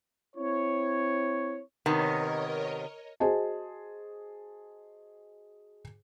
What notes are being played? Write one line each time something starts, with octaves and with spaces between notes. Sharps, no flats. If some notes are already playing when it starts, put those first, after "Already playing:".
C4 E4 C#5
C3 D#3 B3 A#4 C#5 D#5
F#4 G#4 C5 D#5 A5